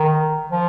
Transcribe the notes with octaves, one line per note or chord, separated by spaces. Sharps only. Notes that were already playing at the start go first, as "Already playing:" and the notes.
Already playing: D#3
F3